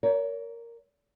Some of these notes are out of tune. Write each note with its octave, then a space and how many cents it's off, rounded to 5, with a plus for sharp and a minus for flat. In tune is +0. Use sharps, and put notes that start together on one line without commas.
A#4 +0 C#5 +35